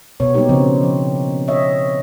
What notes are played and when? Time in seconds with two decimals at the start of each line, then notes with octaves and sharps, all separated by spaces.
0.20 B2 B3 C#5
0.34 G3 A#3 B3 D#4 G4
0.49 C#3 F3 G3 C4
0.83 F3
1.48 C#5 D#5 E5